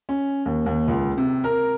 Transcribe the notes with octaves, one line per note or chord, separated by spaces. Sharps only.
C#4
D#2
D#2
C#2
C3
A#4